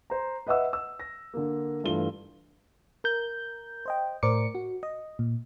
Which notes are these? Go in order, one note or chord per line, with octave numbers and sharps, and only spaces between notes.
C5 A#5
B4 D#5 E5 F#5 E6
E6
A#6
D3 A#3
G2 E3 A3 F4 G7
A#4 G6
C5 D#5 G5
A2 A#4 C5 D5 D6 C#7
F#4
D#5
A#2